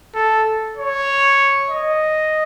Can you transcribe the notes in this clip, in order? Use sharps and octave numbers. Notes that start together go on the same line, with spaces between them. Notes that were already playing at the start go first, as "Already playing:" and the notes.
A4
C#5
D#5